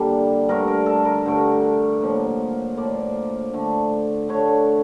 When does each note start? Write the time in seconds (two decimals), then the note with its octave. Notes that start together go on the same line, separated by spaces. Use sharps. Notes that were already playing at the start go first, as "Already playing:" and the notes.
Already playing: D3 G3 A#3 A4
0.49 G2 D3 A3 A#4
0.68 A#4
0.86 A4
1.05 A#4
1.25 G2 D3 A3
2.01 A2 F3 A#3
2.77 A2 F3 A#3 D5
3.53 D3 A3
4.29 D3 A3 C#5